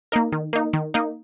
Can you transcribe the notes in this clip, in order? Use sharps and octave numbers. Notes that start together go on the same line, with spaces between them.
A#3 D#4 A#4
D#3
A#3 D#4
D#3
A#3 D#4